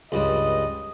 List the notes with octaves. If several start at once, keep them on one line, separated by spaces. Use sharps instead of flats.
C#2 G2 G3 D#5